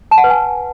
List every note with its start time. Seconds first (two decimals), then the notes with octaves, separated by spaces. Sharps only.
0.11 A5
0.18 F#5
0.24 B4
0.30 G#5